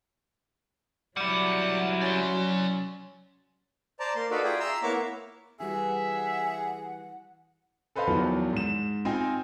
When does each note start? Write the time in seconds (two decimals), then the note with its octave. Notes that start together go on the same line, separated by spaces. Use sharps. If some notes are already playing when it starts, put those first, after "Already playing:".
1.17 F#3 G3 E4 D5 F#5
2.02 C#4 D5 C6
4.00 C5 D5 A5 A#5
4.15 A#3 C6
4.31 D#4 F#4 A4 B4 D5 F5
4.43 F4 G#4 D5 E5 G5
4.60 E5 A#5 C6 E6
4.83 A#3 B3 E4 C#5 A#5 D6
5.60 E3 G3 F#4 G#4 E5 F#5
7.96 A4 B4 C5 D#5 F5 B5
8.07 E2 D#3 F3 F#3
8.53 G#2 E7
9.05 C4 D#4 F4 D#5 G5 G#5